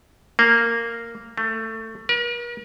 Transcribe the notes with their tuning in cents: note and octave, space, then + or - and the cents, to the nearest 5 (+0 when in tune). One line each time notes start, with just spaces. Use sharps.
A#3 -10
A3 +20
A#4 +45